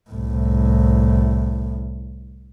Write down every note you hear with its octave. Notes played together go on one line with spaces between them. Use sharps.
C2 A2